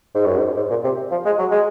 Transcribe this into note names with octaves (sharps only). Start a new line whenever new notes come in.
G#2
F#2
G#2
G#2
A#2
C3
F3
G#3
F#3
G#3